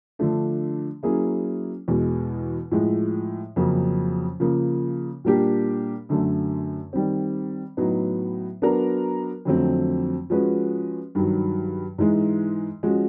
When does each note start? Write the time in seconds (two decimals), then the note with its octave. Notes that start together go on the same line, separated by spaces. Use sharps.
0.19 D3 F3 A3 D4
1.03 F#3 A#3 C#4 E4 G#4
1.88 E2 B2 G#3
2.72 A2 F3 G#3
3.56 F2 C#3 F#3 A#3 C#4
4.40 C#3 F3 A#3
5.24 A#2 G3 A#3 D4 G4
6.09 F#2 D3 F#3 A3
6.93 D#3 G3 C4
7.77 A2 F#3 B3 D#4
8.62 F#3 B3 D4 F#4 A#4
9.45 F2 D3 F#3 A3 C4
10.30 F3 G#3 C#4 F#4 B4
11.15 G2 D#3 F#3
11.98 G#2 E3 G#3
12.83 F3 G#3 C#4 F#4